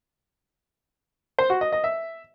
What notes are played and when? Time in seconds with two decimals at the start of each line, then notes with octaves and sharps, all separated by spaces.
1.39 C5
1.50 F#4
1.61 D#5
1.72 D#5
1.84 E5